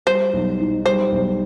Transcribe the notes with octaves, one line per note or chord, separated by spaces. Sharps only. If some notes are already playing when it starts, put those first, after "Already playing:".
G3 C5
B1
D#4
G3 C5
B1